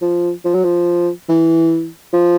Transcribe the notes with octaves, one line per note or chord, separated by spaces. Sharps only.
F3
F3
F#3
F3
E3
F3